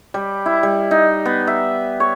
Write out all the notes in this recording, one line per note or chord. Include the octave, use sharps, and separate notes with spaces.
G3
E4
G3
D#4
B3
E5
C#5